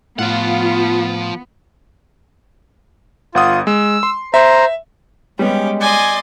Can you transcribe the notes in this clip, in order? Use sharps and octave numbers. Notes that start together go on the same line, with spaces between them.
A2 F3 B3 F4 F#5
G1 F4 F#5 D#6
G#3 E6
C6
C5 E5 A#5
G3 G#3 B3 C#4 G4
D5 D#5 G#5 C6